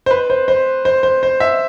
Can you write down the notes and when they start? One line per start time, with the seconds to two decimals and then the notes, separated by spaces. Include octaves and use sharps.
0.06 C5
0.11 B4
0.30 C5
0.48 C5
0.85 C5
1.03 C5
1.23 C5
1.40 E5